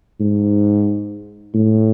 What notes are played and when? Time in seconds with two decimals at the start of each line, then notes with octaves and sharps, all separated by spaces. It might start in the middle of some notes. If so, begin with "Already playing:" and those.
0.20 G#2
1.54 A2